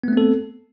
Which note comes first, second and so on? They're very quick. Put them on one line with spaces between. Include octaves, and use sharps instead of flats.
B3 A3 C4 A4